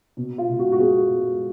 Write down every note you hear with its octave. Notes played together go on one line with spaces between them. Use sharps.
B2
F4
B2
F#4
F#4
B3 G#4